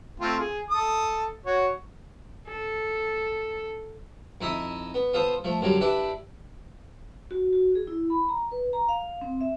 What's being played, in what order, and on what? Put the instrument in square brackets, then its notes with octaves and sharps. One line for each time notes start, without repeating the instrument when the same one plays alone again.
[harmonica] A3 C4 F4
G#4
A4 D#6
F#4 C#5
[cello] A4
[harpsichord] F2 D#4 E4 E5 D#6
B3
B3 F4 A4 C5 D#6
F3 A3
F#2 D3 F#3 G3
D4 E4 G4 B4
[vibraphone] F#4
F#4
G#4
E4
B5
A#5
B4
A#5
F5
C4
E5